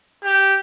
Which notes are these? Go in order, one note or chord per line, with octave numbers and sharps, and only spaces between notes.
G4